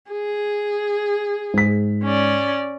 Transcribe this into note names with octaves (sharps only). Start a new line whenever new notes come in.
G#4
G#2 B6
C#4 D5